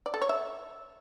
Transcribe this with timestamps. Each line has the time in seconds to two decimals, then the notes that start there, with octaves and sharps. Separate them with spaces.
0.06 D5
0.14 A4
0.22 C#5
0.29 E5